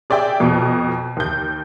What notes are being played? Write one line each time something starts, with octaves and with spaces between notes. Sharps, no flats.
G#4 D5 E5 G5
F2 B2
D#2 G6